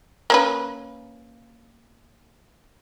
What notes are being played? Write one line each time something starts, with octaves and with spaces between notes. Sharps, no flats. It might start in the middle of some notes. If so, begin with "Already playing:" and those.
A#3 C#4 B4